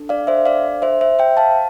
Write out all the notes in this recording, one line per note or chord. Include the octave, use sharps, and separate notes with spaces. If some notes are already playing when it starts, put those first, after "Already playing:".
Already playing: D4 A4
D5 F5
C5 E5
D5 F5
C5 E5
C5 E5
E5 G5
F5 A5